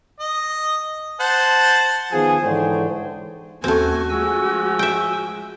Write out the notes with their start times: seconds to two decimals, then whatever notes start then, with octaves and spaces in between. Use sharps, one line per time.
0.20 D#5
1.20 C5 F#5 A5
2.12 D#3 F3 B3 G#4
2.43 G#2 D3 E3 C5 C#5 G5
3.64 D#2 A3 C4 C#4 F#4 G#5
4.10 F3 G#3 G#5 E6
4.79 E5 G5